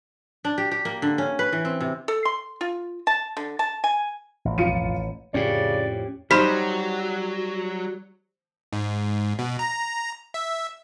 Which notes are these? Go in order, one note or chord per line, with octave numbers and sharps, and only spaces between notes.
D4
G4
G4
A#3
D3
C#4
B4
E3
C4
C3
A4
C6
F4
A5
D3
A5
G#5
A1
B1 F2 F4 C#7 D#7
F2 A2 C#3 C#4 G4 D5
F#3 G3 D#4 C5 B5 F6 B6
G#2
B2
A#5
E5